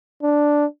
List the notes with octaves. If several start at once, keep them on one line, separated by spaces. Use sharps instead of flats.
D4